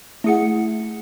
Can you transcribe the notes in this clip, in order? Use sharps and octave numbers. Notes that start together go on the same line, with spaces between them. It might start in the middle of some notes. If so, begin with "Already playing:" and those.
A3 E4 G#4 F#5 C#7